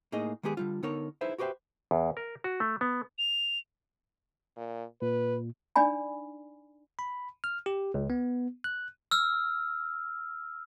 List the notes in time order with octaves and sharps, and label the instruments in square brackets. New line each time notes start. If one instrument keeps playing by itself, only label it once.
[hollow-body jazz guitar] A2 A#3 D#4 G#4 D#5
D#3 G#3 B3 G4 G#4
D3 G3 F4
D3 B3 D#4 A#4 C#5
D#4 E4 G#4 B4 C5 E5
F#4 G4 B4 C5 E5 G5
[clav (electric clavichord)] E2
A#4
F#4
A3
B3
[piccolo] F7
[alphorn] A#2
[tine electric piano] A#2 [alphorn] B4
[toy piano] D4 D#4 D5 G#5 B5
[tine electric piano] B5
F6
G4
C#2
B3
F#6
[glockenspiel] E6 F6